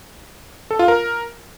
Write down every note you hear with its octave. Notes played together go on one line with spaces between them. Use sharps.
A4
F4
A#4